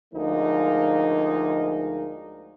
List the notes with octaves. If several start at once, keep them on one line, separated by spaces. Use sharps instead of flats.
D2 F3 G#3 A#3 D#4